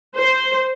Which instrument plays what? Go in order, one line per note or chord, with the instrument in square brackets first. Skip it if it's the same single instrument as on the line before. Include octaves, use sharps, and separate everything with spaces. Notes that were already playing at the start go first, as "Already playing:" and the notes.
[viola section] C5